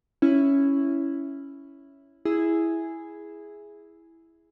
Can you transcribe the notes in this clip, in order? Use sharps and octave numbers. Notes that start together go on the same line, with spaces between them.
C#4 E4
E4 G#4